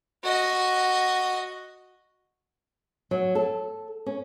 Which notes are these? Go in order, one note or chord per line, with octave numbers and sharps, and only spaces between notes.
F#4 D#5
F#3
A4
C#4